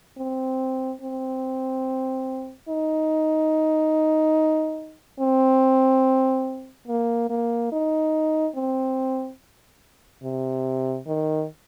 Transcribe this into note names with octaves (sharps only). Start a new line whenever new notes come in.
C4
C4
D#4
C4
A#3
A#3
D#4
C4
C3
D#3